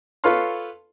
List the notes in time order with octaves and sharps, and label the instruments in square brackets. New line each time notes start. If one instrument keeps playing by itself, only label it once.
[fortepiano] F4 A4 B4 C#5 F5 C6